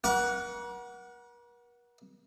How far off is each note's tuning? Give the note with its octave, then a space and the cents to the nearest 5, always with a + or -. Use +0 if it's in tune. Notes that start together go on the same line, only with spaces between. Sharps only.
A#4 +45 F#5 +0 D6 -45